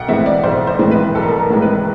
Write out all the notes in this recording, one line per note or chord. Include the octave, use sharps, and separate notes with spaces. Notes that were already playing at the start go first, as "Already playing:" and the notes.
Already playing: B1 F#5 G5
A2 E3 G#3 C4 E5
D5
B1 C5
C5
A2 E3 G#3 C4
B4
B1 A4
A#4
A4
A#4
A2 E3 G#3 C4
B4